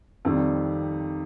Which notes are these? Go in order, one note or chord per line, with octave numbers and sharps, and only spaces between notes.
F2 C3 D#3 G3